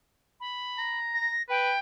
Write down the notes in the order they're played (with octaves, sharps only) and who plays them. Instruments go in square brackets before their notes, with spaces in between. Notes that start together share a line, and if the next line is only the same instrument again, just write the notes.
[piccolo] B5
[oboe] A#5
[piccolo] A#6
[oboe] B4 [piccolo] G5